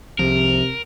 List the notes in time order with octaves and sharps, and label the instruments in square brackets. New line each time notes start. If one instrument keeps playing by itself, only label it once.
[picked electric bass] C2 F3 [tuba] C3 [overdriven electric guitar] A#4